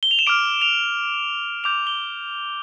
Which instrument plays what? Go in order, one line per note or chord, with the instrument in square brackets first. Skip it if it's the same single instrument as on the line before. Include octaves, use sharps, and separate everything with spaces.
[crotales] G7
F7
E7
D6 F6 D7
F7
D6 G6 F7
G7